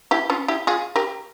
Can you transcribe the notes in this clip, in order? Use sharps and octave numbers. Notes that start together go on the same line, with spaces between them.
E4 G4
C#4 F4
E4 G4
F4 G#4
G4 A#4